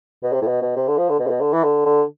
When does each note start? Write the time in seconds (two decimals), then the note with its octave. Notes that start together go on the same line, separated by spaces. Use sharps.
0.23 B2
0.33 C3
0.42 A2
0.47 B2
0.62 B2
0.76 C3
0.88 D3
0.98 F3
1.09 D3
1.19 B2
1.27 C3
1.30 B2
1.41 D3
1.53 E3
1.64 D3
1.85 D3